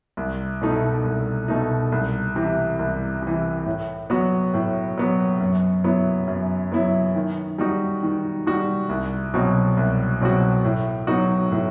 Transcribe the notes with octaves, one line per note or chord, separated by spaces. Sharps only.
C2
B2 A3 D#4
C2
B2 A3 D#4
C2
C3 E3
C2
C3 E3
A2
F#3 B3 F#4
A2
F#3 B3 F#4
F#2
F#3 B3 E4
F#2
F#3 B3 E4
D#3
G3 D#4 F#4
D#3
G3 D#4 F#4
C2
B2 F#3 C4 F#4
C2
B2 F#3 C4 F#4
A2
F#3 B3 D#4 F#4
A2